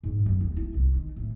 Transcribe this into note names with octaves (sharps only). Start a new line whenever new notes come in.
G#2
F#2
D#2
E4
C2
D#3
A2